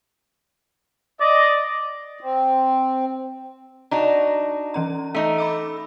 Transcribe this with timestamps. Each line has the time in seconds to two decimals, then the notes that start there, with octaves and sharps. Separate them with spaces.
1.21 D5 D#5
2.21 C4
3.91 D4 D#4 F#4 A#5
4.74 E3 C#4 A#5
5.15 A3 D#4
5.38 B5 D6 E6